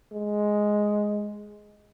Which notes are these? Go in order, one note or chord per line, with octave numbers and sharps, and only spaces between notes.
G#3